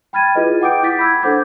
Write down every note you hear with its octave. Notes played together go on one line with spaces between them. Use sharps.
G5 B5 F6 G#6 A6 D#7
E4 F4 G#4 B4 D#5
F#5 G5 D6 D#6 G6 D7
E4 D6 G6 A6 B6
B5 E6 G#6
D4 A4 C5 F#5 D6 G6